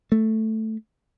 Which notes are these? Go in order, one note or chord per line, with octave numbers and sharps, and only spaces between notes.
A3